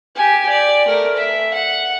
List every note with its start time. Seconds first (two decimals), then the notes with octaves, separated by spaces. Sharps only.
0.15 G4 G#5
0.50 D5
0.85 A3 A#4
1.16 E5
1.54 F#5